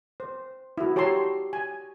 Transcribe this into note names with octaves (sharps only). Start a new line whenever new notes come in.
C5
E4 F#4
G4 C#5 A5 A#5 C6 E6
G#5